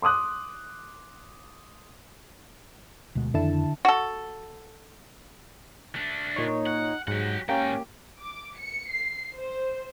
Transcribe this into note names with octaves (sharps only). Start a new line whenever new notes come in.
C6 D6 D#6 F#6
D2 B2 G#3
F2 D3 D#3 E4 A5
F#4 A4
A3 D4
A#2 D#4 C#5
F#5
G#2 F#3 G4 F#5
G#2 A#3 C#4 G4 G5
D6
C#7
C7
C5